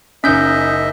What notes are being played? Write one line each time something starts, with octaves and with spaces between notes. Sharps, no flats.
F#1 C#4 D#4 D#5 E5 G6 B6